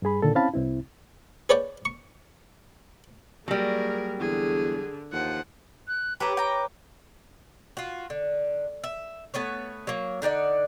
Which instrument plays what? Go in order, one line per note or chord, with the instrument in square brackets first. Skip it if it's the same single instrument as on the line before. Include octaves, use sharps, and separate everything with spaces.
[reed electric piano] G2 G3 G#4 B5
A#2 D3 D#3 A4
C4 C#4 E4 F5 A5 B5
C2 C4 E4
[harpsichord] G#4 B4 C#5 D5 F#5 G5
C#6
[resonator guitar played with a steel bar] F#3 G3 [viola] A#3 G#4 [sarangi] A#4
[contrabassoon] E2 [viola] D3 [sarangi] G#4
[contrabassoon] D#2 [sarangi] F3 [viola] F#5
[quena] F#6
[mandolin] G4 A4 A#5 [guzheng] B4 C#5 [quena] D6
[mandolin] G5 A#5
[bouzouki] F4 F#4
D3
E5
A3 B3 B4 C#5
F#3 A#3
D3 D#4 D5 F#5